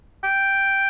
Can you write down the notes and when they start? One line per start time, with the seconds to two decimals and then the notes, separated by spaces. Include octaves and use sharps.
0.24 G5